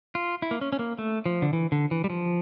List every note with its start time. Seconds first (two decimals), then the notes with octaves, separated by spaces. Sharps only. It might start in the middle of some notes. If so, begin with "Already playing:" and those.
0.15 F4
0.42 E4
0.51 A#3
0.61 C#4
0.73 C#4
0.79 A#3
0.99 A3
1.26 F3
1.42 D3
1.53 E3
1.72 D3
1.91 E3
2.04 G3
2.10 F3